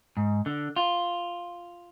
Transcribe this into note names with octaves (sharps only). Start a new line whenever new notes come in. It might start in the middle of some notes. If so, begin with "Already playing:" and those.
G#2
D3
F4